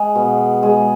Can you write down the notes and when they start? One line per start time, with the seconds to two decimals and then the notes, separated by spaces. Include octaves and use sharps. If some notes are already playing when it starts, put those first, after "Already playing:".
Already playing: G#3
0.15 B2
0.63 G#3